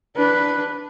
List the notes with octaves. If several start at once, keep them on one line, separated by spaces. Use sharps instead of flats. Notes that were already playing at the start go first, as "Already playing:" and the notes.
D4 B4